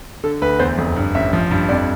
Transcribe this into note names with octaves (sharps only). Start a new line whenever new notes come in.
D3 A4
D2 B4
E2 C5
F1
G2
A1 E5
F3
G2
F2 D5